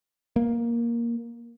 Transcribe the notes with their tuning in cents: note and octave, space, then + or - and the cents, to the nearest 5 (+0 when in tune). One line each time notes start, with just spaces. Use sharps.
A#3 +10